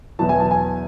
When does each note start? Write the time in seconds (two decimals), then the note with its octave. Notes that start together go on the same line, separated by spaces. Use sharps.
0.19 E2 B2 F#3 B3 E4 A5
0.29 G#5
0.40 A5
0.51 G#5